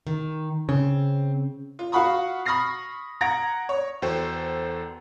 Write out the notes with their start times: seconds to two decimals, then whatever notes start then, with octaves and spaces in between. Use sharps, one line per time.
0.07 D#3
0.69 C#3 C4
1.79 F4
1.92 F#4 F5 F#5 B5 C#6 D#6
2.45 B5 C#6 D#6 F6 A#6 C7
3.21 F#5 A#5 G#6 A#6 D7
3.69 C#5
4.02 E2 F#4 A4 C5 G5